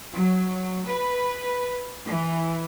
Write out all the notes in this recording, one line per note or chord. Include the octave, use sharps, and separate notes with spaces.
F#3
B4
E3